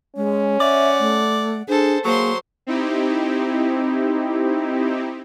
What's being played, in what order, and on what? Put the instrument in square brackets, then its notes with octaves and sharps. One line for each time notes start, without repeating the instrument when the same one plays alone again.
[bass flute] G#3 [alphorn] C#4
[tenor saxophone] D5 [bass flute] E5 [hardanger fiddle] F#5
[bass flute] A3
[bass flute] D4 [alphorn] G#4 [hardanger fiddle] A4 C5
[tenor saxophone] F#3 [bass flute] A#3 [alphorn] G#4 [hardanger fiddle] C5 C6
[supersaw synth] C4 D#4 E4 G4